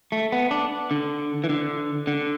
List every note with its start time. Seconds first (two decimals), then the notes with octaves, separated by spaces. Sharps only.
0.12 A3
0.32 B3
0.51 D4
0.91 D3
1.44 E3
1.49 D3
2.07 D3